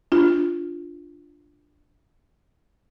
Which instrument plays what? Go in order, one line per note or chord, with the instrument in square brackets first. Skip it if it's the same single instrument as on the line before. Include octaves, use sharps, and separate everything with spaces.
[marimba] D4 F4